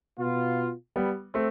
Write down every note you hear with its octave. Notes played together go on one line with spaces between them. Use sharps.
B2 B3 F4
G3 B3
A3 C4